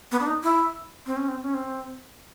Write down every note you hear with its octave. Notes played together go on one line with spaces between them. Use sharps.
B3
D4
D#4
E4
C4
C#4
C4
C#4
C4